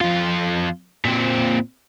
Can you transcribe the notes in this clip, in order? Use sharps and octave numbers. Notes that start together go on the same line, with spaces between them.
F2 F4
A#2 C4